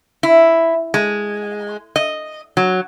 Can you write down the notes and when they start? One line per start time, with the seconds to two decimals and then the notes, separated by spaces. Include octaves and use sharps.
0.23 E4
0.94 G#3
1.96 D#5
2.57 F#3